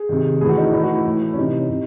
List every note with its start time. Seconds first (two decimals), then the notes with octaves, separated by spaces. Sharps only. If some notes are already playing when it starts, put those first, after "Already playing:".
Already playing: G#4
0.09 C3 D#3
0.41 A2 G#4
0.45 E3 F#4
0.57 D#4
0.73 A2 E3 D#4
0.84 F#4
0.95 E4
1.05 A2 E3
1.34 C#4
1.38 C3 E3 D#4
1.70 C3